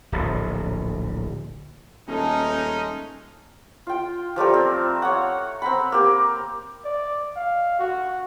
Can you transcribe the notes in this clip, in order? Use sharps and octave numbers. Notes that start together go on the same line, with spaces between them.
D1 A#1
D#1 G#3 A3 C#4 D#4 G#4 A4
F4 G5
F3 G3 A3 A#4
C4
C#5 F#5
C4 A#5 B5
A#3 G4
D5
F5
F#4